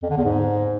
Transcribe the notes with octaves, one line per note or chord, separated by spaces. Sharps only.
F2
D3
E2
G#2